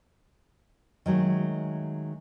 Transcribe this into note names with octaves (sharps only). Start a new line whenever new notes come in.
D#3 F#3 G#3 A3